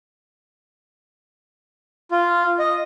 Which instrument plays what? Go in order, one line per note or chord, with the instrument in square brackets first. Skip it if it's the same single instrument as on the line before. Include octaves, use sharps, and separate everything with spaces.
[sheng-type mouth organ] F4
D#5